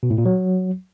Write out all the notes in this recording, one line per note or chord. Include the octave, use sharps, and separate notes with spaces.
B2
A2
A#2
F#3